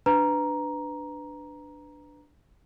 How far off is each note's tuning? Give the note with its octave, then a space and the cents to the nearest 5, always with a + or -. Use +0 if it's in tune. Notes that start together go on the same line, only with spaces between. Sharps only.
D4 +5 B4 +15 A#5 +10